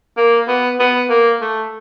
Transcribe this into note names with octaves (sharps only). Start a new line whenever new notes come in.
A#3
B3
B3
A#3
A3